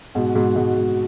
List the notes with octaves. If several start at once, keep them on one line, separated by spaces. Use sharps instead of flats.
G#2 B2 F#4
G#2 B2
G#2 B2
G#2